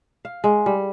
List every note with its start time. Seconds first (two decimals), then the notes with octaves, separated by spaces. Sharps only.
0.25 F5
0.44 G#3
0.66 G3